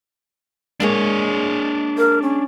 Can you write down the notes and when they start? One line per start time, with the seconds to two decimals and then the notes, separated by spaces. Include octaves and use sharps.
0.80 G#3 A#3 D4 G#4 C#5
1.98 A#4
2.22 C#4